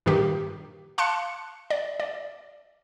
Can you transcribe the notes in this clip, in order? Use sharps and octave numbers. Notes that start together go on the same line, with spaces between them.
G2 A#2 D#3 G4
F5 A5 C6 F#6 C#7
D5
D5